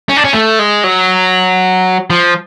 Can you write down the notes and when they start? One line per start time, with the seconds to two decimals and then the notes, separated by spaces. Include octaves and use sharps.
0.09 C#4
0.17 D4
0.24 C#4
0.33 A3
0.59 G#3
0.84 F#3
2.10 F3